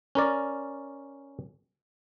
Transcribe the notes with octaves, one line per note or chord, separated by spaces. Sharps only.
C#4 A#4 D5